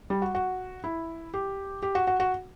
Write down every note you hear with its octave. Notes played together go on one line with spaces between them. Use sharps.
G3
F#4
F#4
E4
G4
G4
F#4
F#4
F#4